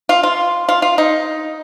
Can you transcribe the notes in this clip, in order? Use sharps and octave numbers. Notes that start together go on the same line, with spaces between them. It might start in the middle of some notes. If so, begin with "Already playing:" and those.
F4
F4
F4
F4
D#4